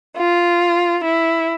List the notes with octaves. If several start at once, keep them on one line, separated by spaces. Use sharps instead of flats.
F4
E4